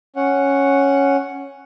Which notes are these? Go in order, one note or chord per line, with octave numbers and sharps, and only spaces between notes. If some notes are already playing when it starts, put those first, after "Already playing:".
C#4 F#5